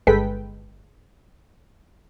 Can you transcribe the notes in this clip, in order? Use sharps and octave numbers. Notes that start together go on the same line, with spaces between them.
G1 G#3 A4 B4 G5 B6